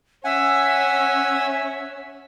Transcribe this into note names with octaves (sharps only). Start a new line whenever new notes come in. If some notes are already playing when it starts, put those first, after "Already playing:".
C#4 E5 F#5 G#5